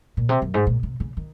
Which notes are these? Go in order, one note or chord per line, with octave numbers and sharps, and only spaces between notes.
A#2
C3
F#2
G#2
A#2
C3
C#3
D#3